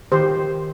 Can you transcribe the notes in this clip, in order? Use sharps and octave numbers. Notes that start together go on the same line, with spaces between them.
D#3 G4 C5
D#3